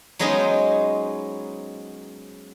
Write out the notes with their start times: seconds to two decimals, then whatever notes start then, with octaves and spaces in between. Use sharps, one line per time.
0.19 F#3 G#3 B3 C#4 D#4 C5